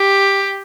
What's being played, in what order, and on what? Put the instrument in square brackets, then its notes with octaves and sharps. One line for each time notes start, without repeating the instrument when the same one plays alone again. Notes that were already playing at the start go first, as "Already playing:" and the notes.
Already playing: [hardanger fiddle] G4